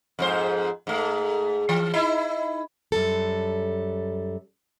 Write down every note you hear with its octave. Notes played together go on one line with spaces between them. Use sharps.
F2 G#2 C5
G#2 A3
E3
D#4 E4
F#2 G3 A4